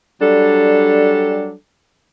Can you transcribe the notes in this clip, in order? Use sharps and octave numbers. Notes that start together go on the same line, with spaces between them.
F#3 G3 D4 A4